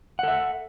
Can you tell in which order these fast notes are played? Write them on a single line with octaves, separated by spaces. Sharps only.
F#5 A4 E5